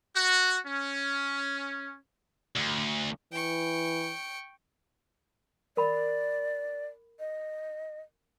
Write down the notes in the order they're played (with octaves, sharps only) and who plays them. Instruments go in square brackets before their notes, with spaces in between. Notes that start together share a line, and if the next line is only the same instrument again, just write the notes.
[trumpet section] F#4
C#4
[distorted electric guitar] D2
[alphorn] E3 [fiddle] G5 C#6
[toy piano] A#4 B5 [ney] D5
[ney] D#5